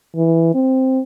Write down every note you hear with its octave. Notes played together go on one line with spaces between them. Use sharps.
E3
C4